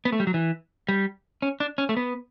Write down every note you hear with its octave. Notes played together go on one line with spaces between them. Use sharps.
B3
A3
G3
F#3
E3
G3
C#4
D4
C#4
A3
B3